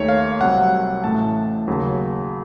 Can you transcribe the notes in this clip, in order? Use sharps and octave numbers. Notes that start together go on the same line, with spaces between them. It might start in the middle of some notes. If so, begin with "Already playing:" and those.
Already playing: D#2 D#3 A3 C#5
F5
C2 C3 F#3 F#5
A1 A2 A3 A5
D#2 C#3 F#3